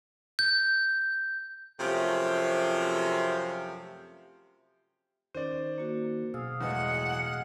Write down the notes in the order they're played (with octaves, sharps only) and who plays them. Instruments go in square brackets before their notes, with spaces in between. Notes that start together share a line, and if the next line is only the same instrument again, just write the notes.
[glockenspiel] G6
[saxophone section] F#2 C3 F3 A3 G4
[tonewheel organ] D#3 [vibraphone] C#4 [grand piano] C5 D5
[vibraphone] A#3 F#4
[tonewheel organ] B2 G#4 F5 [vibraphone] F#3 D#6 E6
[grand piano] E2 A2 G#3 [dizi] F#5